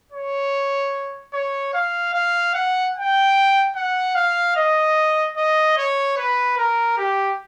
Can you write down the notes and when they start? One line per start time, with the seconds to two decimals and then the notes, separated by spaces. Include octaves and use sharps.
0.12 C#5
1.33 C#5
1.74 F5
2.14 F5
2.54 F#5
2.95 G5
3.76 F#5
4.15 F5
4.56 D#5
5.37 D#5
5.77 C#5
6.17 B4
6.57 A#4
6.97 G4